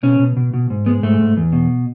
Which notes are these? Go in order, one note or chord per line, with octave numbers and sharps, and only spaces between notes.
B2 C#4
B2
B2
B2
G#2
G#3 B3
G#2 A3
G#2
E2
B2